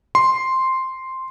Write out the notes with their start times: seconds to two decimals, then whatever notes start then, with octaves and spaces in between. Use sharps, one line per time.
0.15 C6